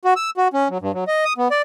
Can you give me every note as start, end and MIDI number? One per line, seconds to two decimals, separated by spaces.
0.05 0.14 66
0.16 0.30 88
0.37 0.48 66
0.54 0.68 61
0.70 0.78 54
0.81 0.92 43
0.94 1.04 54
1.08 1.24 75
1.25 1.33 87
1.38 1.48 59
1.51 1.62 74